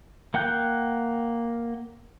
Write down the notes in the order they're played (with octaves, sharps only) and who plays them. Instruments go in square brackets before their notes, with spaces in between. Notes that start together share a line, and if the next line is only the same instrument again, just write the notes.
[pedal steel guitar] A#3 F#5 G5 F#6 G6